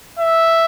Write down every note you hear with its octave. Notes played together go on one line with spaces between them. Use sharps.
E5